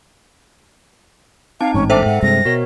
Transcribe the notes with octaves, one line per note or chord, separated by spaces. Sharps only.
C4 D#4 F5 A5
A1 G#2 C#4
D4 A4 C5 E5 G5
G#2 F#5
G2 C3 G#3 A#6
B2 F#4 A#4 C#5